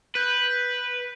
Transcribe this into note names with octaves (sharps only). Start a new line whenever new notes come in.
B4 F#6 G6